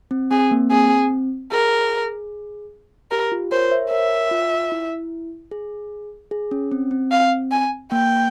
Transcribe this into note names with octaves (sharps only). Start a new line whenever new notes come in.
C4
C4 G#4
A#3
C4 G#4
G#4 A#4
G4 A#4
F4
A#4 C5 C#5
C5 E5
A#4 C#5 E5
F4
E4
G#4
G#4
C#4
C4
C4
F5
G#5
A#3 G5